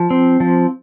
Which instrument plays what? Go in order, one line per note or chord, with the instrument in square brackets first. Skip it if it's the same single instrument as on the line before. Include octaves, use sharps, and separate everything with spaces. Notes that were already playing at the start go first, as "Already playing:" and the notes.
Already playing: [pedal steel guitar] F3
C4
F3